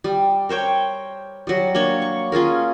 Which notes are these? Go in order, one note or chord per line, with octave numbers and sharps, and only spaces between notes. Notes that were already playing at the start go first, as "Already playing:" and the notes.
G3
A#4 C5 C#5 G5
F#3 G3
A#3 D4 C#5
C#6
C#4 F4 G#4 A#4